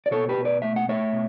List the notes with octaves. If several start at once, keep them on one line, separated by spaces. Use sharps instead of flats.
D5
B2 A4 C#5
G4 B4
B2
B4 D5
A3 E5
F#5
A3 C#5 E5
B2